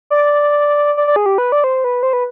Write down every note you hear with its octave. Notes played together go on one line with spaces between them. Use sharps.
D5
D5
D5
G#4
G4
B4
D5
C5
B4
C5
B4